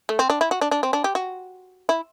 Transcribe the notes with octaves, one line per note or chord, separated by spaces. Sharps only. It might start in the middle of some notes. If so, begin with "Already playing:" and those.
A3
C4
D4
E4
F#4
D4
D4
C4
D4
G4
F#4
E4